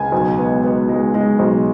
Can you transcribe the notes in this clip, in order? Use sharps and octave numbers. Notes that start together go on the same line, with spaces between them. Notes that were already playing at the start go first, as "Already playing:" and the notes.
Already playing: C#2 G#5
B1
B3
B3
G#3
G#3
B1